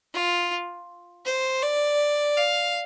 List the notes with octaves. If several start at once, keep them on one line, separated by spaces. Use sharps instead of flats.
F4
C5
D5
F5